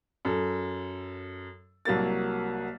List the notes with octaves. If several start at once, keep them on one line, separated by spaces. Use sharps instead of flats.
F#2 A4
C2 F#3 A#3 A6